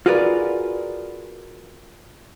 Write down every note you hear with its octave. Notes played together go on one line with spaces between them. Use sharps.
F4 F#4 G#4 A#4 B4 D5